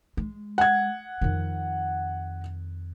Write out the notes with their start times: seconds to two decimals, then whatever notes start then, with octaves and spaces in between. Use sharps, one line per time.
0.17 G#3
0.58 F#5 G#6
1.21 F2 D#3